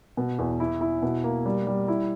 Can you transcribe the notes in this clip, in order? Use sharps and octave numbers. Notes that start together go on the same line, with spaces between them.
B2
E2
E4
E4
B2
A#3
G3
G3
E4